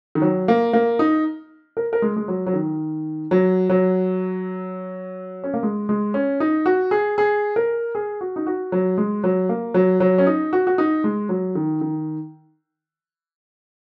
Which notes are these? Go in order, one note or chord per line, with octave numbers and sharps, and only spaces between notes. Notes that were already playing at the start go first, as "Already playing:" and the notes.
D#3
F#3
A#3
A#3
D#4
A#4
A#4
G#3
G#3
F#3
F#3
D#3
F#3
F#3
C#4
A#3
G#3
G#3
C#4
D#4
F#4
G#4
G#4
A#4
G#4
F#4
D#4
F#4
F#3
G#3
F#3
A#3
F#3
F#3
C#4
D#4
F#4
F#4
D#4
G#3
F#3
D#3
D#3